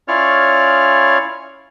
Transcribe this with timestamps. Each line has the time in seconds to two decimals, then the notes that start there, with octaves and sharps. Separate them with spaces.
0.08 C#4 E4 F4 C#5 D5 F6